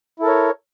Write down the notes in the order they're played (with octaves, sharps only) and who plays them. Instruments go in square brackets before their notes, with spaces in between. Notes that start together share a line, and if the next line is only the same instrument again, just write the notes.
[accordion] E4
A4
A#4
C#5